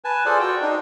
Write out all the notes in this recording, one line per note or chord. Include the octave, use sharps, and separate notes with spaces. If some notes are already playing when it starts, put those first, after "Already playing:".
B4 G#5 A5
F4 G#4 A4 C5 D5
F#4 G5
D4 D#4